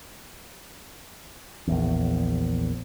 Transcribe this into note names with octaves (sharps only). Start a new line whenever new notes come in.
A#1 E2